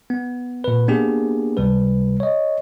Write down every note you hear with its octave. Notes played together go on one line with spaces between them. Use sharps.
B3
A#2 B4
A#3 B3 D4 G4 G#4
C#2 C3 G3 B4
C#5 D#5